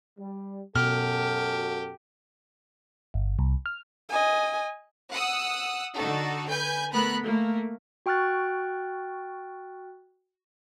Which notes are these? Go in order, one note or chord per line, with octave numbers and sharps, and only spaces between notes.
G3
F#2 B2 F#4 G4 A4 F6
G1
C2
F6
D#5 G#5
F#5 D#6 E6
D3 D#4 F#4 A4
B4 G#5 G6
A3 B3 A#4 B5 F#6
A3 A#3
F#4 G5 C#6 F6 F#6 A6